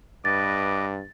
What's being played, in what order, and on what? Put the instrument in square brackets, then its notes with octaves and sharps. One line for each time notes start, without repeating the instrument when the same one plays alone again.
[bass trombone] G2 [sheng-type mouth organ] B4 D#5 [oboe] D6 [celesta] A6